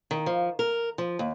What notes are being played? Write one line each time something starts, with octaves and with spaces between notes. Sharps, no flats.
D#3
F3
A#4
F3
D#2